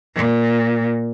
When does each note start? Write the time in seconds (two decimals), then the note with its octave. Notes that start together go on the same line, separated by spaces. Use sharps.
0.15 A#2